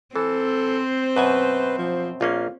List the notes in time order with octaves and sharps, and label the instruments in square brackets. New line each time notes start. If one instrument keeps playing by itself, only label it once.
[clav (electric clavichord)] E3 [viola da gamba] C4 C5 [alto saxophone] A4
[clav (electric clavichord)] F#2 B2 G#5 [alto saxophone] B4
[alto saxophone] F3
[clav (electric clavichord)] A#1 A#3 C#4 [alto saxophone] F4